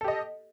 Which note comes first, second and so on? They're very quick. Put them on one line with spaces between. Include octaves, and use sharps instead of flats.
A4 G4 D#5